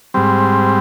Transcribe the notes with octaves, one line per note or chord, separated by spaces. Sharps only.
G#2 G3 C4